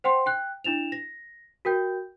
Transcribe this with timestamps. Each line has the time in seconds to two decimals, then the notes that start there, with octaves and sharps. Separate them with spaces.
0.04 C5 F#5 G5 C6
0.26 G5 F#6
0.64 D4 E4 E7 F7
0.92 A#6
1.65 F#4 A#4 G5 G6